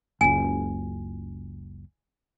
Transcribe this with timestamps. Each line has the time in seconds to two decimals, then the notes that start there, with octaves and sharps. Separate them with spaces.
0.21 F#1 C#2 G#5